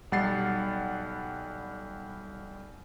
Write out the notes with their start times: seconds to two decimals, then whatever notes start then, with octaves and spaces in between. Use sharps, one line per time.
0.12 B1 G3 F#5 A6 C7